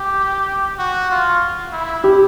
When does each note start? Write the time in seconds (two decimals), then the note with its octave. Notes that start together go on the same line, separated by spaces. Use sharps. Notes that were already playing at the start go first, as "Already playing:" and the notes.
Already playing: G4
0.79 F#4
1.11 F4
1.73 E4
2.04 G4